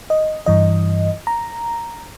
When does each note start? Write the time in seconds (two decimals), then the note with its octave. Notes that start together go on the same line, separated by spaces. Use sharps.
0.10 D#5
0.46 G2 E3 D#5
1.27 A#5